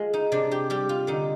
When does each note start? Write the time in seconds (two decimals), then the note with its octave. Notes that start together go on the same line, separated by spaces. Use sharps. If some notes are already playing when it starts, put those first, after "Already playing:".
Already playing: G#3 F4
0.14 D#4
0.32 C3 D4
0.51 G4
0.70 G3 G4
0.89 F4
1.07 D3 D#4